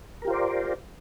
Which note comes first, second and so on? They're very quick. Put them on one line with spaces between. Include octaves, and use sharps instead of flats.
A#4 G4 F4 C5 D5